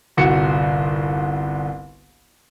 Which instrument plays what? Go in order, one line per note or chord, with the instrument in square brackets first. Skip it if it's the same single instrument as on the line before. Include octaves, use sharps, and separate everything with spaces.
[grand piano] G1 C2 F#4 C#7